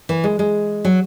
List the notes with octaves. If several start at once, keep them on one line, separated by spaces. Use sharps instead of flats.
E3
G#3
G#3
F#3